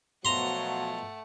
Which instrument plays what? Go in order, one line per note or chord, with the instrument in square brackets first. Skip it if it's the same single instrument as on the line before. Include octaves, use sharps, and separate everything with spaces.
[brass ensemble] B2 F3 F#3 [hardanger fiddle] A3 F#5 [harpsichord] A#5 C6